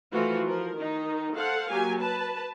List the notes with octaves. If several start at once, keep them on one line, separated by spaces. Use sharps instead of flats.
E3 F3 A3 F4 F#4
F3 A#4
D#3 D#4
A4 C5 F5 F#5
F#3 A#3 G4 G#5
B4 A5